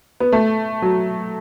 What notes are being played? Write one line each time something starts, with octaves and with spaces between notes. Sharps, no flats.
B3
A3
F#3